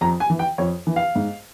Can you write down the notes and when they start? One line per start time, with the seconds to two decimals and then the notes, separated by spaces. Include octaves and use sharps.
0.01 F2 A#5
0.20 G#5
0.30 E3
0.39 G5
0.58 F2 C#5
0.87 E3
0.96 F5
1.15 G#2